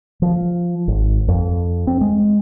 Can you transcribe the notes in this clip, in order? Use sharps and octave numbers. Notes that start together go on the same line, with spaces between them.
F3
G#1
F2
C4
G#3